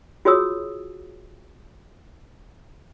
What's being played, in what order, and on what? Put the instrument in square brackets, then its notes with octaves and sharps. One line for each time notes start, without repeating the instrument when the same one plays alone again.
[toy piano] F4 F#4 G#4 C#5 D#6 E6